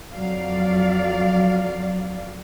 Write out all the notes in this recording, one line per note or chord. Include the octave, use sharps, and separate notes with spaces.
F2 F#3 D5 F5